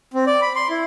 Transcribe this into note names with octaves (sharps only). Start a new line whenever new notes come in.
C4
D5
B5
C6
E4